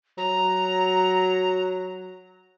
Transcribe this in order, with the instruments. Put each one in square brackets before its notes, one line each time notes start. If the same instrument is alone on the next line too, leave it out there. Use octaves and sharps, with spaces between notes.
[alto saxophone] F#3 [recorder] A#5